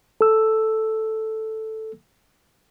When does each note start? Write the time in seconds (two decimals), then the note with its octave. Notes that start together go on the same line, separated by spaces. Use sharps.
0.21 A4 E6